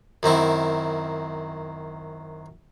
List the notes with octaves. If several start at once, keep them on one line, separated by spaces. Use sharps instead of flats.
F#2 D#3 C4 E4